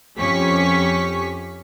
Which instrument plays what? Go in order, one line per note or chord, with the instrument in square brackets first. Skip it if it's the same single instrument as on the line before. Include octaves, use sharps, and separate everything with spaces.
[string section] F2 C#4 G4 C#6 B6